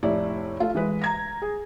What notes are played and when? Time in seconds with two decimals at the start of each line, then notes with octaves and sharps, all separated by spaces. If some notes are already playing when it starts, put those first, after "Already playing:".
0.03 F1 A2 E4 D5
0.60 A3 F4 A4
0.75 E3 G#3 B4
1.02 A#5 G#6 A#6
1.42 G#4